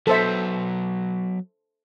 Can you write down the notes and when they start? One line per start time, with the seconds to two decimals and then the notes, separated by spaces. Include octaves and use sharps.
0.07 F#3 B3 A4 C5 E5